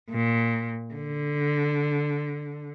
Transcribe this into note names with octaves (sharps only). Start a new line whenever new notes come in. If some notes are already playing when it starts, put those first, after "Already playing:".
A#2
D3